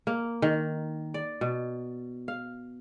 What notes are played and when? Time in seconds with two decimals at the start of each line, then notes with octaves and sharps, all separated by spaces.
0.07 A#3
0.42 D#3
1.14 D5
1.41 B2
2.28 F5